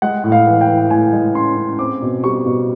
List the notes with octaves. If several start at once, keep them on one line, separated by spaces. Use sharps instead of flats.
G#3 F#5
A2
F5
E3
G5
E3
A2 G#5
G#3
C#4 C6
C#4
C4 D6
B2
G3 C#6
B2